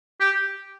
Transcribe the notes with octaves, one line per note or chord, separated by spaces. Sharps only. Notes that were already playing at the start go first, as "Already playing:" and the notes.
G4